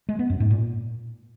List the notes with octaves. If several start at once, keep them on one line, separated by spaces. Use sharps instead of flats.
G#3
B3
F#2
G#2
A#2